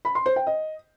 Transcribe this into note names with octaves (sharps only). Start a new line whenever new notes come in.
B5
C6
C5
G5
D#5